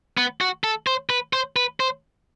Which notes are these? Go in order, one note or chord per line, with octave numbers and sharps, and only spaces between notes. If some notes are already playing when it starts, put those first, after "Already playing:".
B3
F#4
A4
C5
B4
C5
B4
C5